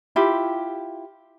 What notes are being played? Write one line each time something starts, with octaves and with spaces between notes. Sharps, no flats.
E4 F4 G4